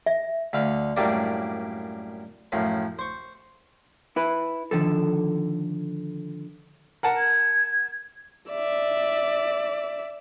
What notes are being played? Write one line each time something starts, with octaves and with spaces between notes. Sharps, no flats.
E5
D2 D3 F5 B5
F#2 A2 G3 A#3 D4
F#2 A2 F3
C5 C#6
E4 B4
D3 D#3 F3 A4
A#4 F#5 A5
G#6
D5 E5